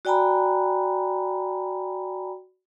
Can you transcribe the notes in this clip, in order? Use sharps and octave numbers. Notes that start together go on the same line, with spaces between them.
F#4 D5 G5 G#5 A#5 B5